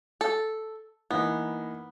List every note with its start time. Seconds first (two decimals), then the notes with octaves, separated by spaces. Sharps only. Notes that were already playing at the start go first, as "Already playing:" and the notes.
0.21 A4
1.11 E3 A#3 B3 D#4